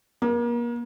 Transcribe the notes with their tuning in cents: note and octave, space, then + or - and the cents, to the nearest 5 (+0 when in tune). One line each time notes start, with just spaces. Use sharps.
A#3 +35